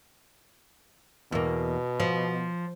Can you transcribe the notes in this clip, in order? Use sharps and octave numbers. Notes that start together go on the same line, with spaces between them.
E2 B2 A#3
F3